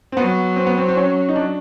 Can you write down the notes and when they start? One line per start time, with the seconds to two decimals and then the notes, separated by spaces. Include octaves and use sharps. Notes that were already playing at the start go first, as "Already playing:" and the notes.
0.12 C4
0.17 F#3 B3
0.56 C4
0.66 B3
0.78 C4
0.88 C4
0.97 C#4
1.29 D#4
1.36 D4